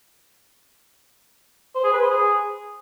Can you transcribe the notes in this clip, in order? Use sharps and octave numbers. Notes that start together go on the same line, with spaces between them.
C5
G#4
B4
C5
G#4